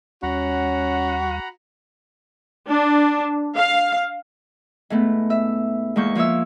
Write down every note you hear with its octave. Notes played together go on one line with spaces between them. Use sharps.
D#2 G3 C#4 F#4 F#5 A#5 B5
D4
F5
G#2 A3 B3
E5
E2 G#3 A#3 C#6 G6
F3 A#3 C#5 E5 E6